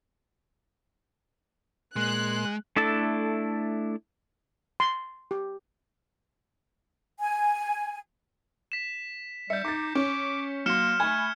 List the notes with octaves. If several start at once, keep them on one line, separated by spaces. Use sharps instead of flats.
A#2 G#3 C6 F#6
A3 D4 E4 A4 A5
C6
G4
G#5
B6 E7
G3 E5 G6 C#7
D#4 D6 A6
C#4 D6
F#3 A#3 C6 F6 C#7 E7
A3 G#5 B5 G#6